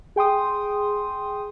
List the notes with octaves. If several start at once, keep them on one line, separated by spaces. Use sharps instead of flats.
G#4 G5 C6 D#6